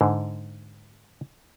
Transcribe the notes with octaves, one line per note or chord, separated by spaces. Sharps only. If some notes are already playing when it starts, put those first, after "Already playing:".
G#2 D3